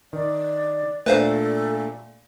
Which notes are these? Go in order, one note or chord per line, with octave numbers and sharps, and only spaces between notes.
D#3 D5
A#2 A3 D4 A4 B4 C5 F5